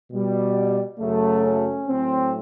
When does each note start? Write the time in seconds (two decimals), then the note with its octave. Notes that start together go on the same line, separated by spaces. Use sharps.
0.11 B2 G3
1.00 F#2 C#3 F#3 A3
1.44 C#4
1.88 A2 F#3 A3 C4